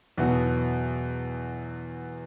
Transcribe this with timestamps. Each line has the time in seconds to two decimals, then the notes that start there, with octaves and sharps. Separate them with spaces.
0.18 E2 B2 F#3 B3